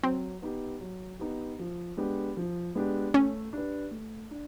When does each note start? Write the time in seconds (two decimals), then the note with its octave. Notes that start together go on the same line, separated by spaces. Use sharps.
0.03 F#3 C4
0.42 B3 D#4 G4
0.81 F#3
1.19 B3 D#4 G4
1.59 F3
1.97 G#3 B3 D4 G4
2.37 F3
2.75 G#3 B3 D4 G4
3.14 A3 C#4
3.53 D4 G4 B4
3.91 A3
4.31 D4